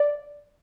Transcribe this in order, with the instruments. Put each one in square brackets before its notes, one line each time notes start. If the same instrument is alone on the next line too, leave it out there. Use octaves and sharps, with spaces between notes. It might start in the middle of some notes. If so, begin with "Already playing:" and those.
Already playing: [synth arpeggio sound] D5